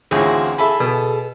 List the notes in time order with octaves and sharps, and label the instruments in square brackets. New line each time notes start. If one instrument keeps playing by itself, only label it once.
[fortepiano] A1 D2 G#4 [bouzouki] C4 F4 F#4
[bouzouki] G#4 A4 [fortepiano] E5 B5
[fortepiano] B2